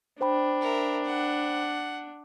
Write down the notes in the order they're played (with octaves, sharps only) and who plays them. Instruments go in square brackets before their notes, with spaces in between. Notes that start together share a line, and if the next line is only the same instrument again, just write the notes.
[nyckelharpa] D4 [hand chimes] C5 G5 B5
[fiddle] A#4 E5
F#5